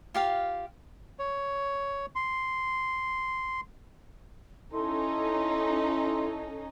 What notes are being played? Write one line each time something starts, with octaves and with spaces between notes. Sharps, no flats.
F4 G4 F5
C#5
C6
C#4 D#4 E4 A4 C6